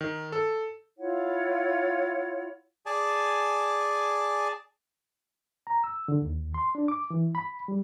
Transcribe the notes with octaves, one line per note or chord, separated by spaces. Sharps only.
D#3
A4
E4 F4 C#5 F#5
G#4 D5 G#5 A5
A#5
E6
D3
D#2
C6
D4
D6
E3
B5
G3